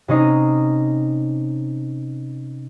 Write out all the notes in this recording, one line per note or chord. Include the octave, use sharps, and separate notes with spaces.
C3 C#4 D#4 C7